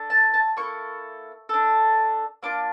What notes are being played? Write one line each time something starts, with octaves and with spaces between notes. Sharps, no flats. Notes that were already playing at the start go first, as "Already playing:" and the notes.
Already playing: D4 A4
A5
A5
A#3 E4 A4 C#6
D4 A4
A#3 D4 F4 D6